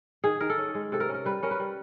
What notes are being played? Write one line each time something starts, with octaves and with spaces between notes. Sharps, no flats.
D#3 G#4
D#3 A#4
A4
C#4
G#3
C3 A4
A#4
C#4
A#4
G3 B4
C#4 A#4
B4
G3